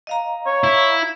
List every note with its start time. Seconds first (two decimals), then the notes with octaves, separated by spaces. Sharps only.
0.07 D#5 F5 A#5
0.46 C#5
0.64 E4